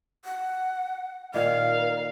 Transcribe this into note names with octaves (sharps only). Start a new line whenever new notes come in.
F#5
A#2 D#3 A#4 F5